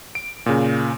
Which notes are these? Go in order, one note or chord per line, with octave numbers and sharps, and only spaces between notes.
D7
A#2 C#3